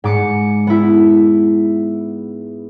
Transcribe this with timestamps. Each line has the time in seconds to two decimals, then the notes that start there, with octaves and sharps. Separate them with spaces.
0.04 G#2 D6 C#7
0.67 B3 E4